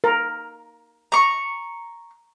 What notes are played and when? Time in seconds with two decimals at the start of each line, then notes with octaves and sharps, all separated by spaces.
0.04 A#4
1.12 A#5 C#6